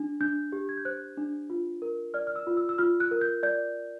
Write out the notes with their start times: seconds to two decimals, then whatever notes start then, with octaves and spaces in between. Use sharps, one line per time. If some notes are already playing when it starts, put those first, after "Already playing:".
Already playing: D4
0.21 D4 G6
0.52 G4
0.69 G#6
0.77 G6
0.85 C5 F#6
1.17 D4
1.50 F4
1.82 A#4
2.14 D5 F6
2.27 F6
2.36 E6
2.47 F4
2.57 E6
2.69 E6
2.78 F4 F6
3.00 F#6
3.11 A#4
3.21 G6
3.43 D5 G6